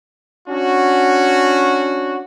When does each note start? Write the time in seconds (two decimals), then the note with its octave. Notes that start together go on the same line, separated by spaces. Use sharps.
0.48 C#4 D4 F#4